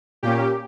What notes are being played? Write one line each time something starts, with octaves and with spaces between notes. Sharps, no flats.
A#2 A#3 C#4 G4